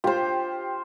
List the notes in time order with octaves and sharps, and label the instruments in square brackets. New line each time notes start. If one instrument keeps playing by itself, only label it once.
[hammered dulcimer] F4 C5 [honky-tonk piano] G4